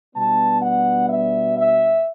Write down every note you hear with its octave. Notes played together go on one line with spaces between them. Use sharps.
B2 G3 B3 D4 A5
F#5
E5
E5